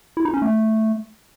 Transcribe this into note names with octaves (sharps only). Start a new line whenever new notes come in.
E4
D#4
C#4
A3